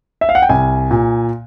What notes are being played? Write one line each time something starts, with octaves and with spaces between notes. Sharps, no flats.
E5
F5
F#5
G5
C2 G#5
A#2